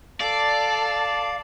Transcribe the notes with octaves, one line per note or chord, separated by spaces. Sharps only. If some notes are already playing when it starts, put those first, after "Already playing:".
A4 D5 F5 A5